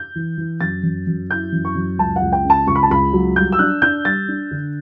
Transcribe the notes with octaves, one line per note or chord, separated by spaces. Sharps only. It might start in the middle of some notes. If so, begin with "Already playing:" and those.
Already playing: G6
E3
E3
F#2 A6
F#2
F#2
E4 G6
F#2
C#6
F#2
C#2 A5
F#5
C#2
G5
C#3
A5
C#2 C#6
B5
A5
C#2 B5
F#3
G3 G6
E6
D4 F#6
D4 G6
G3 A6
D4
D3